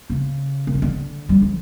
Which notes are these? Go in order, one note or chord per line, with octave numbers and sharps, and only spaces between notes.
C#3
A#2
C#3
D3
G3
F3